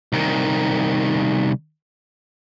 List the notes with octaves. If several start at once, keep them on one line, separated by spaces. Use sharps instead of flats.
C2 D#3